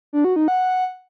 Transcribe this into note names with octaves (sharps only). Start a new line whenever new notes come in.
D4
F#4
D#4
F#5